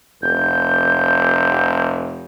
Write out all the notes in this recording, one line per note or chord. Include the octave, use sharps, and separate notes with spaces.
F1 G6